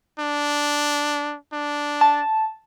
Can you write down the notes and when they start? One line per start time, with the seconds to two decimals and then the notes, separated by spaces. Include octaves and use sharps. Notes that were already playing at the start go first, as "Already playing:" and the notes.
0.19 D4
1.53 D4
2.01 A5